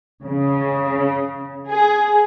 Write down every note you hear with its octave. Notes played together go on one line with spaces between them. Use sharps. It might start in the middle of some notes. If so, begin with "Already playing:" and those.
C#3
G#4